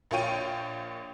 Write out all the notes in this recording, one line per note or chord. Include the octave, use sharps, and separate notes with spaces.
A#1 A#3 F4 C#5 G5 D#7